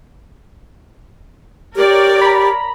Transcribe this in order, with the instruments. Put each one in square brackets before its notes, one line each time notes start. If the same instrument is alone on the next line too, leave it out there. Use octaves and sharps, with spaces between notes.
[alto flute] G4 [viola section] A#4 C#5 D5
[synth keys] A#5 B5